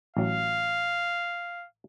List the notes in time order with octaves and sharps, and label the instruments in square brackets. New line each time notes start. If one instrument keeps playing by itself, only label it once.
[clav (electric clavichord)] A1 F#3 [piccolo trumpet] F5